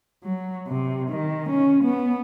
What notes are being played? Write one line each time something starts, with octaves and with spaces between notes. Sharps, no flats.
F#3
C3
D#3
C#4
B3